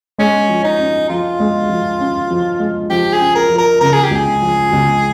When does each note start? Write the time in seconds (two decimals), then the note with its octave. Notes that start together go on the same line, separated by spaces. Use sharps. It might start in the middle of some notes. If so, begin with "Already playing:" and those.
0.18 G#3 C#4
0.49 F3
0.64 D#4
0.79 C#4
1.09 F3 F4
1.40 G#3
1.69 F3
2.00 C#4
2.31 F3
2.59 G#3
2.90 F3 G4
3.13 G#4
3.20 C#4
3.35 A#4
3.50 F3
3.58 A#4
3.80 C#3 A#4
3.93 G#4
4.03 G4
4.11 C#2 G#4
4.42 F3
4.72 C#2